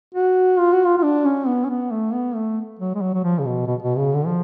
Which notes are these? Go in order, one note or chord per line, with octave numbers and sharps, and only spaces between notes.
F#4
F4
F#4
F4
F4
D4
C#4
B3
C#4
B3
A3
B3
A3
F#3
G#3
F#3
F#3
F3
C#3
B2
B2
B2
C#3
D3
F3